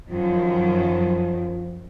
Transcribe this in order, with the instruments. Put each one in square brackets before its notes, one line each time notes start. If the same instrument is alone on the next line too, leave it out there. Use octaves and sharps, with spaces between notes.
[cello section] F#2 D#3 [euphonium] F3